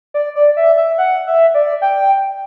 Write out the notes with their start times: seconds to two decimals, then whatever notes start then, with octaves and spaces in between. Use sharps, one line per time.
0.14 D5
0.36 D5
0.57 E5
0.77 E5
0.98 F#5
1.27 E5
1.54 D5
1.82 G5